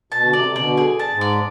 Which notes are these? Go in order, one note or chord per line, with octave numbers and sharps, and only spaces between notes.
B2 A5
D3
C3 D5
C3
B2 D3 D5
G#4
A5
G#2
D5